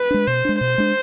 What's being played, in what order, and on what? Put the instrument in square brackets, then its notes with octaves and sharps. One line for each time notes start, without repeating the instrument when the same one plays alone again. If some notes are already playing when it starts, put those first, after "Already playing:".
Already playing: [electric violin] B4
[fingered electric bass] G#3 D4
[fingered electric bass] B2 [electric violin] C5
[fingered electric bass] G#3 D4
[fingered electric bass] B2 [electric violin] C5
[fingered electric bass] G#3 D4